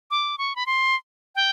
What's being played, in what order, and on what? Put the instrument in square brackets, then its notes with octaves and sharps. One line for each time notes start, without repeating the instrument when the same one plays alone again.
[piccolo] D6
C#6
B5
C6
G5